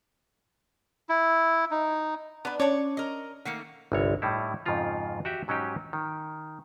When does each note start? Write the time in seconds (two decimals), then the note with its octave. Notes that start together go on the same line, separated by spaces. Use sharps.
1.09 E4
1.71 D#4
2.45 B3 D4 B4
2.60 C#4 D4 C#5 D5
2.97 A#4 D#5
3.45 D#3 A3 A#3 F#5 C7 C#7
3.92 G1 C2 C#5
4.22 A2 G3 D#4 E4
4.66 F2 G#2 C#3 F3 F4 A#5
5.25 F#4 G4 E5
5.48 G#2 F#3 C#4 D#4 G4
5.93 D#3